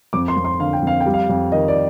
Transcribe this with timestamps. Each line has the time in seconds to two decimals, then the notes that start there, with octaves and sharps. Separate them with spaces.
0.13 F2 D6
0.28 C6
0.37 F2
0.45 C6
0.60 D3 F5
0.73 G5
0.83 F2 F5
1.00 G5
1.06 G3
1.14 F5
1.30 F2
1.52 D#3 D#5
1.68 D5